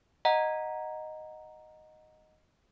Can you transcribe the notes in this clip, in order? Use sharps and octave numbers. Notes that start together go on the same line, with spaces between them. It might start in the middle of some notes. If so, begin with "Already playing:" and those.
D#5 F#5 A#5